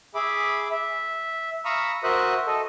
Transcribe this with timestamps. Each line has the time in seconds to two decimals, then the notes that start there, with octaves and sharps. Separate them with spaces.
0.15 G#4 E5 B5 D6
0.71 E5
1.65 F5 A#5 B5 C#6 D#6 E6
2.04 F#4 A#4 C5 E5 D#6 F#6
2.47 A4 D#5